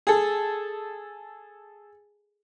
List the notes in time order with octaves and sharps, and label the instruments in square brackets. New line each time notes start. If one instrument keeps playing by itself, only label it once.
[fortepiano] G#4 A4